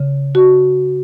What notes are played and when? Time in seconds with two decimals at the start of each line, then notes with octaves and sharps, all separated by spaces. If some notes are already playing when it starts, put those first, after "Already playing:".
Already playing: C#3
0.35 F#4